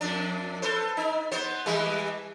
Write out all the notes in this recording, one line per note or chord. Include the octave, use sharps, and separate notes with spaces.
F2 D4
A4 B4 C5
D#4
B3 C5
E3 G3 B4